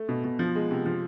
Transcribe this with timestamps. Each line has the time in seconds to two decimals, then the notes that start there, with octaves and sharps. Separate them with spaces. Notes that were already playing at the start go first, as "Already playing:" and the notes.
Already playing: A3
0.09 B2
0.24 B2
0.39 F3
0.55 G#3
0.71 C3
0.86 F3